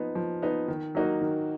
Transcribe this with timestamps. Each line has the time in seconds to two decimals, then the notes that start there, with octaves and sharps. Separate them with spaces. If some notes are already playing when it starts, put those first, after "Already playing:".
Already playing: F3 B3 D#4
0.15 F3
0.42 B3 D#4
0.68 D#3
0.95 F#3 A#3 D#4 F#4
1.21 D#3